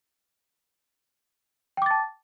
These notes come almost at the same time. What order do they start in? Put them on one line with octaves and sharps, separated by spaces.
G5 D6 A6 A5